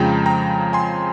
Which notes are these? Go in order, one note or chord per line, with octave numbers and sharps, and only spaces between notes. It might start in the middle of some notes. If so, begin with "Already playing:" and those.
Already playing: F2 C#3 F3 G#3 G5 A#5
G5 A#5
G#5 C6